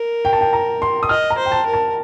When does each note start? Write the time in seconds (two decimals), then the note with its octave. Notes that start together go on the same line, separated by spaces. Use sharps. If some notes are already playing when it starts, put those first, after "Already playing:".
Already playing: A#4
0.25 G5
0.33 A5
0.41 G5
0.53 A#5
0.82 C6
1.03 D#6
1.09 D#5 F6
1.30 A#5
1.38 C5
1.46 G5
1.52 A5
1.66 A#4
1.73 A5